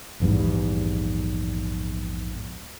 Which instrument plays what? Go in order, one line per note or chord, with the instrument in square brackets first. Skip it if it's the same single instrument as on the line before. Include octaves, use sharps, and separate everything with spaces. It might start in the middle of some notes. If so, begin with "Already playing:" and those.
[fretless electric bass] A#1 E2 G#2 G3